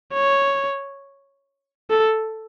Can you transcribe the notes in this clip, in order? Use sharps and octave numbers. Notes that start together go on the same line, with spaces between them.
C#5
A4